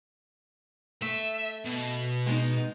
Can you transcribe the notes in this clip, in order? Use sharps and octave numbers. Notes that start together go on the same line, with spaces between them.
A3 E5
B2
G#3 B3 D#4